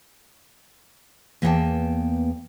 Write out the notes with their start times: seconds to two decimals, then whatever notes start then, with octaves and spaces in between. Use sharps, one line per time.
1.42 E2 A#3 B3 F#5 G5 A5